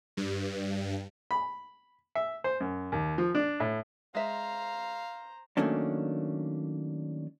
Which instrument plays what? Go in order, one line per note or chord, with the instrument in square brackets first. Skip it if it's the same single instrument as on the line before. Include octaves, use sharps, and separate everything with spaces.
[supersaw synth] G2
[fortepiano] B5
E5
C5
F#2
D#2
F3
D4
A2
[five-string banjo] G#3 E5 [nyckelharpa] C5 A#5 [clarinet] F5
[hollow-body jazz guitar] D#3 F#3 A3 A#3 C#4 D4